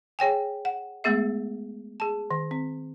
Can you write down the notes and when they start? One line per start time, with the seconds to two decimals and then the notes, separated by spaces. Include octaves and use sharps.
0.19 G#4 C#5 G5 G#5
0.65 F#5
1.04 G#3 A3 B3 G#4 E5
2.00 G#4 A5
2.31 D#3
2.51 C4